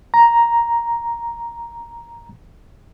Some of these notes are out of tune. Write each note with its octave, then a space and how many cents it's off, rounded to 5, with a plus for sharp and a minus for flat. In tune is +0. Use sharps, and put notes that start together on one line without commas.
A#5 +5